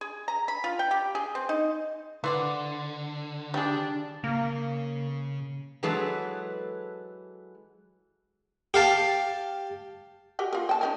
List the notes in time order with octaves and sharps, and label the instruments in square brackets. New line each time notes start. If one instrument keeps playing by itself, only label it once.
[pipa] G#4
A#5
B5
F4
G5
G4
G#4
C4
D#4
[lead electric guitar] D3 [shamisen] E3 [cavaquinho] C5 D5 F#5
[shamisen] G3 G#4 [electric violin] D4 [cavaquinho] G5
[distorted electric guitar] C#3 [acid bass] A#3
[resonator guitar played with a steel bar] E3 F#3 G#3 G#4 A4 B4
[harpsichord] G4 F5 A5
[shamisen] F#4 G4 A#4
F4 A#4
G5 A5
C#4 D#4 A#4